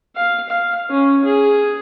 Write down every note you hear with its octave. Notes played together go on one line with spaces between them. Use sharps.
F5
F5
C#4
G#4